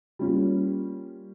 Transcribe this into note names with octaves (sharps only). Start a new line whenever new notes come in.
G3 A#3 C#4 F4